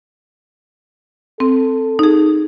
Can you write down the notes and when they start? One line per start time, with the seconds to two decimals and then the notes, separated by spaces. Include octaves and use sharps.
1.40 C4 A4
1.99 D#4 G#4